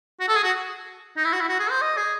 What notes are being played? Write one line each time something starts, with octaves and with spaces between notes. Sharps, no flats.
F#4
A4
G#4
F#4
D#4
E4
F#4
E4
F#4
G#4
C5
D#5
G#4